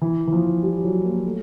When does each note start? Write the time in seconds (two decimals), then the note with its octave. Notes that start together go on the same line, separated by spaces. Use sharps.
0.02 E3
0.27 E3
0.33 F3
0.63 G3
0.84 F#3
1.04 A#3
1.25 A3